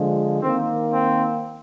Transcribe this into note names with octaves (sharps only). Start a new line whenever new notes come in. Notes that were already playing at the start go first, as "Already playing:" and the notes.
Already playing: D3 F3 G#3
D#3 A#3 C4
C4